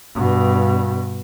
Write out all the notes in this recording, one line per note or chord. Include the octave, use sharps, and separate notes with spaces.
G2 B2